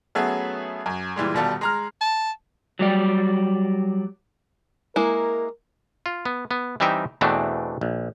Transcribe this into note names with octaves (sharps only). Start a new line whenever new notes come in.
F#3 A3 B3 C#4 G#4 E5
F#2
A#2 E3 G3 G#3
D#1 B2 G3 F4 A4
G#3 A#5 F6
A5
F#3 G3 D5
G#3 A#3 E4 A#4
F4
B3
B3
E3 G3 C4 D#4 E5 G5
E2 B2 E3 A3 C4 D4
A#1